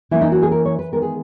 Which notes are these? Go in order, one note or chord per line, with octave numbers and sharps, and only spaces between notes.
E3 A#3 C#4 E4
D#4
F#4
G#4
A#4
C#5
B4
D#3 G#3 B3 A#4
G#4